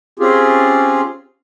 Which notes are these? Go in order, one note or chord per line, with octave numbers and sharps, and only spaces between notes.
C4 C#4 F4 G4 G#4